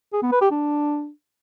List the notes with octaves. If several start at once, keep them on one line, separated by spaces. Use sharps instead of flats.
G#4
B3
B4
G4
D4